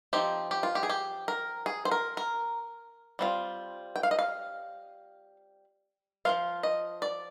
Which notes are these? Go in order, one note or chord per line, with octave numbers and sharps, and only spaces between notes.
F3 C4 D#4 G4
G4
F4
G4
G#4
G4
A#4
G#4
C5
A#4
A#4
G3 C4 F4
G5
F5
D#5
F5
F3 C4 F4 F5
D#5
D5